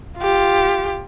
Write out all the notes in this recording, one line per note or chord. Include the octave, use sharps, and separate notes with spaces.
F4 G4